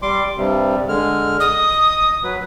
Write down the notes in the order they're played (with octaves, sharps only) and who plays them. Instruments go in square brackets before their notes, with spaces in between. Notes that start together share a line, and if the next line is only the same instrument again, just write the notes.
[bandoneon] G3 C6 D6
G2 C3 G3
D3 G#3 F6
[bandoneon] D#5 [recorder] D#6
[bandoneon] F#3 B4